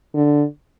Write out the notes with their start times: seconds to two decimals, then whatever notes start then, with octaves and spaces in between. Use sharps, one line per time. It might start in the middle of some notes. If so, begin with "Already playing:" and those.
0.15 D3